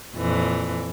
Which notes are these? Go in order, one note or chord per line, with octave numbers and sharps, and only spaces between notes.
F2 A#2 E3